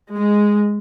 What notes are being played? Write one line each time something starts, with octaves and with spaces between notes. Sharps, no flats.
G#3